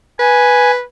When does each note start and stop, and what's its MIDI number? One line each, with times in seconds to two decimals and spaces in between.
0.19 0.82 71
0.19 0.71 80